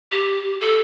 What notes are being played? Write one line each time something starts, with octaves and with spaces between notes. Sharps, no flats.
G4
A4